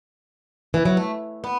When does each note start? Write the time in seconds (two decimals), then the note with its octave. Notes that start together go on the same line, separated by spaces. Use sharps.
0.74 E3
0.85 F#3
0.97 A3
1.44 B3